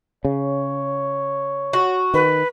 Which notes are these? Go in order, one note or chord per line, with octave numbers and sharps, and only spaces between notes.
C#3 C#5
F#4
D#3 B4